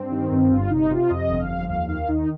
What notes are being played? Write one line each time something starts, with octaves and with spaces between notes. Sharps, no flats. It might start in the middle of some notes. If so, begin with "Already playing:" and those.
Already playing: G2 C4
D#3
G2
G1 F4
C3 D#4
C3 F4
F2 D#5
G1
F5
F2
D#2 F5
D#3 F5
D#2 D#4